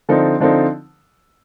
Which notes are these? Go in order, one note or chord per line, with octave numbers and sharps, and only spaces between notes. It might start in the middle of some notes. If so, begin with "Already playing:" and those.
D3 F3 C4 D#4 A4
D3 F3 C4 D#4 A4